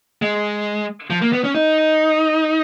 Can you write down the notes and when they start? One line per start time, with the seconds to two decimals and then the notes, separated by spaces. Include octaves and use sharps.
0.22 G#3
1.10 F3
1.22 A#3
1.33 B3
1.44 C#4
1.55 D#4